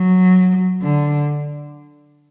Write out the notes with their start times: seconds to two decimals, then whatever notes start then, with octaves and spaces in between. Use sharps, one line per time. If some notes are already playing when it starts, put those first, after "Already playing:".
Already playing: F#3
0.82 D3